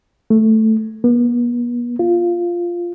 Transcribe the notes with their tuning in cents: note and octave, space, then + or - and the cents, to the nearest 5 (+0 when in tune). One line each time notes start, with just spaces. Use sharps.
A3 +0
B3 -40
F4 -5